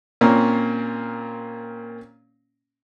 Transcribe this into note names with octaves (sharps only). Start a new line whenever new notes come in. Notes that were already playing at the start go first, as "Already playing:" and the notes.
A#2 A#3 C4 C#4